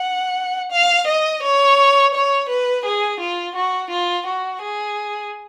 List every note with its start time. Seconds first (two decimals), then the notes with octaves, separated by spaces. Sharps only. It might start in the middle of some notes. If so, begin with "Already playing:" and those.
Already playing: F#5
0.72 F5
1.07 D#5
1.43 C#5
2.14 C#5
2.49 B4
2.85 G#4
3.20 F4
3.55 F#4
3.90 F4
4.26 F#4
4.62 G#4